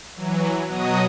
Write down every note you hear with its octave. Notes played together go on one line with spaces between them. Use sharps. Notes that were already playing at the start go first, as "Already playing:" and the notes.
E3 F#3
B2 F#3 F#4 D#5 D#6